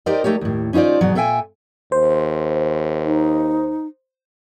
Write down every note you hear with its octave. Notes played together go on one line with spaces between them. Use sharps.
D#4 G4 A#4 C5 D5 D#5
A3 D#4 G4 C#5
D#2 A2
C#4 D#4 F4 C5 D5
E2 G#2 B2 F#3
A#2 A4 E5 G5 G#5
D#2 C5
D#4